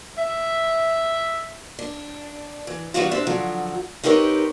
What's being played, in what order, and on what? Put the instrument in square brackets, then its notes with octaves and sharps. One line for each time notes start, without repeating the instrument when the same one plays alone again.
[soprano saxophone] E5
[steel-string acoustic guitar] D4
E3
E3 G3 B3 D4 F4 F#4
C4 D4 G4 E5
D3 F3 F#3
C4 D#4 G4 A#4 B4 C#5